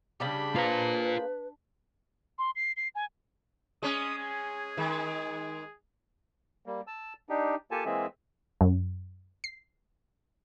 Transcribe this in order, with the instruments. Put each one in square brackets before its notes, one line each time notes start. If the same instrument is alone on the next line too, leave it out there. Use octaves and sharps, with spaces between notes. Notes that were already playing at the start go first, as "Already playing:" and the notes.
[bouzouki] C#3 G3 G4 [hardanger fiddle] D4 B5
[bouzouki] A#3 G#4 C5 [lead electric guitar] F4 A#5 [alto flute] B4
[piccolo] C6
C7
C7
G#5
[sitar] G#3 C#4 [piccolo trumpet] D#6
[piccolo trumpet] G#4
[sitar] D#3 G#3
[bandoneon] G3 A#3
A5 E6
D4 D#4 G4
A#3 F4 G4 A4 G#5 A5
E3 G#3 A#3 C4 G#4 E5
[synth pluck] F#2
C7